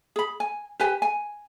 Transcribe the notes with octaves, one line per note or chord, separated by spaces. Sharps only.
G#4 B5
G#5
G4 B4 G#5
G#5